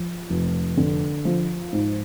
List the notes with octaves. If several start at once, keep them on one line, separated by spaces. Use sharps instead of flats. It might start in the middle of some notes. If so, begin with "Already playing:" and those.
Already playing: F3
F1
D3
F3
G#2